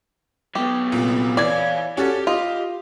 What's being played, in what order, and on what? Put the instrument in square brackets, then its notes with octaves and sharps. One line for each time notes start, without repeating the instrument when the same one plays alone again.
[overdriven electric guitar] F#3 B3 [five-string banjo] G4
[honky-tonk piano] C2 A#2
[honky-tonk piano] E3 G#6 [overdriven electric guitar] C#5 F5 [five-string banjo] D5
[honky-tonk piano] C#4 F#4 A4 [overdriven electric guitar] G4
[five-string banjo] F4 [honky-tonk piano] D#5